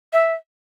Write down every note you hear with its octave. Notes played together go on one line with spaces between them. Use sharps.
E5